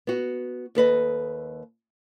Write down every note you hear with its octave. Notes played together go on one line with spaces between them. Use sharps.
B3 F#4
D#2 A4 B4 D#5